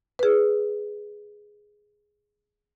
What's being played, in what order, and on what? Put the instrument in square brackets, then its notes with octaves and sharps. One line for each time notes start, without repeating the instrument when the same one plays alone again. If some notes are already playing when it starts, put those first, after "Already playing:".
[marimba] G#4 B4